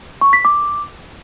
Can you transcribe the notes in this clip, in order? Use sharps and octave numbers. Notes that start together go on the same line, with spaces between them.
C#6
B6
D6